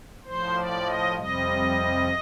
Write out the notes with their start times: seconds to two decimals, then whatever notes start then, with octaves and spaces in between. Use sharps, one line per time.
0.24 A2 F3 C5
0.55 D5
0.86 D#5
1.16 F2 C3 G3 D#5